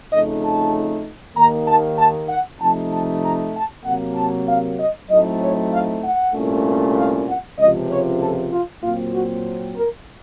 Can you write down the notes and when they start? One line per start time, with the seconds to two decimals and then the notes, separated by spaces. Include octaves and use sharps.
0.11 F2 C#3 A3 D#4 D#5
0.42 A5
1.36 D#2 D#3 A#3 A#5
1.66 A5
1.98 A5
2.29 F#5
2.60 C3 F3 A3 D#4 A5
2.91 A5
3.23 A#5
3.54 A5
3.84 C3 F#3 A#3 F#5
4.16 A5
4.47 F5
4.79 D#5
5.09 A2 F#3 A3 C4 D#4 D#5
5.40 C#5
5.71 F5
6.02 F#5
6.33 C2 A#2 A3 C#4
6.96 F5
7.27 F#5
7.58 C#2 C3 F3 D#5
7.89 C#5
8.20 A4
8.51 F4
8.82 A#2 F#3 C4 F4
9.13 F#4
9.76 A#4